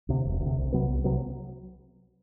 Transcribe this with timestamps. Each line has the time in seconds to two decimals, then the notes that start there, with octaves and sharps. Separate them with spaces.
0.09 D2 C3
0.25 E1
0.40 D2
0.46 C3
0.58 C2
0.72 C3 F#3 B3
0.89 C2
1.04 C3 F#3 B3